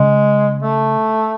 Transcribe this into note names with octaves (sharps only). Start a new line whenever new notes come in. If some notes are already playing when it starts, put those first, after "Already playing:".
Already playing: C#3 G#3
A3